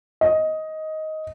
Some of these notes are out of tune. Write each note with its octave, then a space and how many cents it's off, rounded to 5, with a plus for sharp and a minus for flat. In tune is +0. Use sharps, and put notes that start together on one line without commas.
D#5 +10